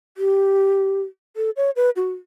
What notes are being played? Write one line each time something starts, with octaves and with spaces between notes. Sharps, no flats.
G4
A4
C#5
B4
F#4